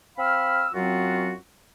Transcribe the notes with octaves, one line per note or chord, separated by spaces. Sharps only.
C4 F5 B5 E6 F6
F#2 F#3 C4 F4 F#4